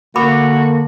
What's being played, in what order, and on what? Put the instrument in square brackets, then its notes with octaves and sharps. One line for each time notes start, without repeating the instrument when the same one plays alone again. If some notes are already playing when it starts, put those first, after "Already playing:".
[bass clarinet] D3 [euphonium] A#3 [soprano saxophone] F#4 [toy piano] A#4 B5 D6